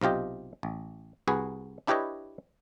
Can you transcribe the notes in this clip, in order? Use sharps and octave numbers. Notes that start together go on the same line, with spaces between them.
B1 C3 F4 G4 D#5
A1
C2 F#4 G#4 B4
D4 E4 G4 B4 C#5 D#5